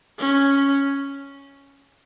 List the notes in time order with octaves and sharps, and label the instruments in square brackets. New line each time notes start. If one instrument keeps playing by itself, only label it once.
[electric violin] C#4